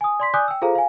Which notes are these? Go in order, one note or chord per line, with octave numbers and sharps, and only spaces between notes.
G#5 D#6
D5 C6 B6
D5 G#5 D6 D#6 F#6 G6
G5 E6
F4 G#4 A4 C5 F5 A#5
F5 G#5